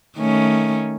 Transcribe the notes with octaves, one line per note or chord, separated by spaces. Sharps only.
D#3 A3 C#4